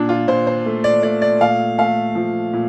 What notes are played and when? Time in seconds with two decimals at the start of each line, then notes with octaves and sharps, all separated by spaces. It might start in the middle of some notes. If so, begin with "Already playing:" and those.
Already playing: A#2 D4
0.09 F4
0.27 A#2 C5
0.47 C5
0.66 A3
0.84 D5
1.03 A3 D5
1.22 D5
1.41 A#2 F5
1.78 A3 F5
2.15 F3
2.53 A#2